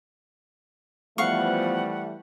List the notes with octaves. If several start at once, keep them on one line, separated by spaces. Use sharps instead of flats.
E3 F3 G3 A3 B3 F5 F#5 C#6